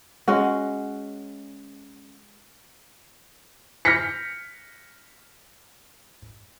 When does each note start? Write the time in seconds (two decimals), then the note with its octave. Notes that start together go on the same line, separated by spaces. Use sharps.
0.28 G#3 C#4 F#4
3.85 F6 G6 A#6 B6 C#7